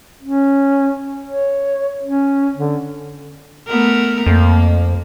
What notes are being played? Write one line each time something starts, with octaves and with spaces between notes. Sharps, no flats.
C#4
C#5
C#4
D3
A3 B3 A#4
F2 A#3